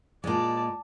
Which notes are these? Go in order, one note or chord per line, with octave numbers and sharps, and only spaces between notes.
A#2 G#3 D5 A5